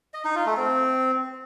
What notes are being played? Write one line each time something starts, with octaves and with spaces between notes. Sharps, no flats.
D#5
D#4
F4
A3
C4